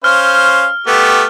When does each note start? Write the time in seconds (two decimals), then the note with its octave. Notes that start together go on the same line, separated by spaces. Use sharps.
0.04 C#4 C5 F5 F6
0.87 A3 B3 G4